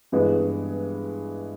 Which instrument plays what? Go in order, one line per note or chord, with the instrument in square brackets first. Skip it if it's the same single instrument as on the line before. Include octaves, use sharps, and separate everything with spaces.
[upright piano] G2 E3 G#3 B3